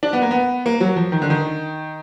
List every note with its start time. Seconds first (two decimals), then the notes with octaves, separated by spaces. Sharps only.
0.03 D4
0.13 B3
0.22 A#3
0.31 B3
0.66 A#3
0.80 F#3
0.96 F3
1.12 D#3
1.22 D3
1.30 D#3